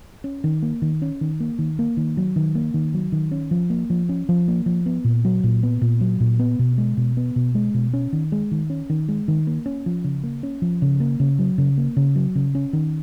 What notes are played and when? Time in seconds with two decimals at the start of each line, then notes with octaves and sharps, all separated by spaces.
0.24 C#4
0.44 D#3
0.62 A#3
0.82 D#3
1.02 C#4
1.21 D#3
1.40 A#3
1.59 D#3
1.79 A#3
1.97 D#3
2.17 F#3
2.36 D#3
2.55 A#3
2.74 D#3
2.94 F#3
3.12 D#3
3.31 C#4
3.51 F3
3.70 A#3
3.90 F3
4.09 C#4
4.29 F3
4.48 A#3
4.66 F3
4.86 B3
5.04 A#2
5.25 F#3
5.44 A#2
5.63 B3
5.81 A#2
6.01 F#3
6.20 A#2
6.39 B3
6.59 B2
6.78 G#3
6.97 B2
7.17 B3
7.36 B2
7.55 G#3
7.74 B2
7.93 C#4
8.13 D#3
8.32 G#3
8.51 D#3
8.70 C#4
8.90 D#3
9.09 G#3
9.28 D#3
9.47 A#3
9.66 C#4
9.86 F3
10.04 C#3
10.24 A#3
10.43 C#4
10.62 F3
10.82 C#3
11.00 A#3
11.20 C#3
11.39 F#3
11.58 C#3
11.78 A#3
11.97 C#3
12.16 F#3
12.35 C#3
12.55 C#4
12.73 D#3